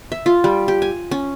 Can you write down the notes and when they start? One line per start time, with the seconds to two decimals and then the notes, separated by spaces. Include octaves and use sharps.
0.12 E5
0.26 F4
0.44 G3
0.68 G4
0.82 G#5
1.11 C#4